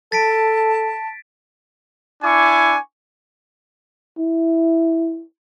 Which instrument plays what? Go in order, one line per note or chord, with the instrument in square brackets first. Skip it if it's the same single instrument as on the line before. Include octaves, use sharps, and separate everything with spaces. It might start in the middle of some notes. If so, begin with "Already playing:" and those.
[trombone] A4 [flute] A5 [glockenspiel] A6 B6 D7
[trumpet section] D4 E4 G#5 C#6 D6
[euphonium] E4